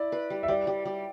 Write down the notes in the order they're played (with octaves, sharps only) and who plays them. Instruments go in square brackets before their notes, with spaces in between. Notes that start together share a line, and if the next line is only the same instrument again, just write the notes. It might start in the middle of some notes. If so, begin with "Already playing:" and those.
Already playing: [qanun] E4 [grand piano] D5
[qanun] B4
G3
[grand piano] E5
[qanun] G3 [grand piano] D5
[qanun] G3
G3